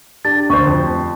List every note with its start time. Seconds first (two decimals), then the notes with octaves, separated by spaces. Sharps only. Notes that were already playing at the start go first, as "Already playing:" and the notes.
0.25 D4 G4 A5 A6
0.50 D2 C5 C#6
0.67 F2